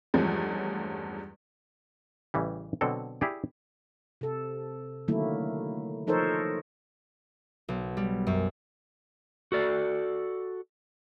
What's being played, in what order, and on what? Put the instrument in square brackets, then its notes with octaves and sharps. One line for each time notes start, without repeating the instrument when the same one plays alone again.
[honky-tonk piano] E2 G2 F3 G#3 A3 C#4
[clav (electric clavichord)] A1 C#3 E3 G3
B2 D3 F#3 C4 A4
E4 G4 G#4 D5
[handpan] C3 A4
D3 D#3 F#3 A3 A#3 E4
F3 D#4 A4 A#4 C5 C#5
[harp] B1
G3
F#2
[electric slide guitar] F#4 A4 D5